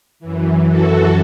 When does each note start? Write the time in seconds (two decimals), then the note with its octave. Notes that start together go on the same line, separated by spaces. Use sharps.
0.20 F#2 E3
0.68 F#4 A4